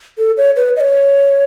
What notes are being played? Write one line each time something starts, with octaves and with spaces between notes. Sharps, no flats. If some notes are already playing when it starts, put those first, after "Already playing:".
A4
C#5
B4
D#5
C#5